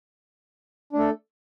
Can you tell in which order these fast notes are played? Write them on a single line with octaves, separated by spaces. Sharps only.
D4 A3 A4